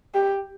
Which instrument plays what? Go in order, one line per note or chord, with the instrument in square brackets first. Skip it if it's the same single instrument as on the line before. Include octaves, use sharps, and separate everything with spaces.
[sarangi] G4